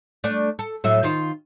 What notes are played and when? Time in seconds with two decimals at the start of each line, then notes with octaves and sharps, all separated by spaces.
0.24 A3 D4
0.59 A4
0.84 A2 F#3 E5
1.03 D#3 F4 C5